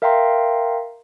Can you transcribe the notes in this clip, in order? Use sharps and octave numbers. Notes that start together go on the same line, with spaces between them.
A#4 E5 F5 G5 A#5 C6